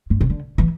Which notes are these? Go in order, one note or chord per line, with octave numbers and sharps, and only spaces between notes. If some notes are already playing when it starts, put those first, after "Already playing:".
G2
C3
D3
E3